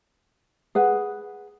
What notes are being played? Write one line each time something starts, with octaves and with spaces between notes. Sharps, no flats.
G#4 B4 F#5